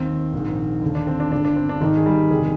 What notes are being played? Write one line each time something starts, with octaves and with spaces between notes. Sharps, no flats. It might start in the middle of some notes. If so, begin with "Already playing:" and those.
Already playing: D#2 D#3 C4
A#1 G#2 D#3
D#2 D3
D4
C4
D4
G1 G2 D3 D4
D4
C4
D4
G#1 G#2 D#3 D#4
G#4
G3 G4
G1 F2 C3 D#3 G#3 G#4